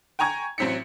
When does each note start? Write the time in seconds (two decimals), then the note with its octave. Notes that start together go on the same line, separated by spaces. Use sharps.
0.19 G5 G#5 A#5 C#6 G#6
0.58 A1 F#3 C4 B6 C#7